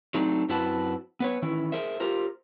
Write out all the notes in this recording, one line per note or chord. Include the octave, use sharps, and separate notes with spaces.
F#3 A3 C4 D4 D#4
F#2 C4 E4 F#4 B4 A5
B3 B4 C#5
D#3 E3 C#4 E4
G#4 A#4 C5 E5
F4 G4 A#4 C5